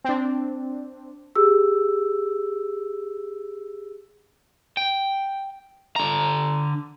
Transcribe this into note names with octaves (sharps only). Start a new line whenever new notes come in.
C4 D4
G4 G#4 E6
G5
D3 A#5